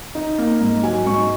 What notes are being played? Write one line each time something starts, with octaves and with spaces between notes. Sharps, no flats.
D#4
A#3
G#2
F#3 G#5
G#2 C#6